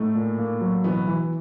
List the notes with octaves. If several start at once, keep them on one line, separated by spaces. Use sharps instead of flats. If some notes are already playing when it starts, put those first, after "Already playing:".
Already playing: A2 A3 D#4
A#2
A#3
F#3
B2 E3 B3
E3